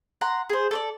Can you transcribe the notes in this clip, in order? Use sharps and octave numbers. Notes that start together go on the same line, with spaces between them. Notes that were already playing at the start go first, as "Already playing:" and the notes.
F#5 A#5 C6
G#4 C5
A4 C#5 D5